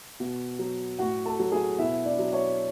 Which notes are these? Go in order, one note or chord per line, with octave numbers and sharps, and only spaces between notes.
B2
F#3
A2 F#4 F#5
A4 A5
F#3
G#4 G#5
B2 E4 E5
D4 D5
F#3
C#5